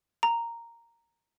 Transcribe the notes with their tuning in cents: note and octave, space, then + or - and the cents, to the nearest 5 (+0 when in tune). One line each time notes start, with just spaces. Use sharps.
A#5 -5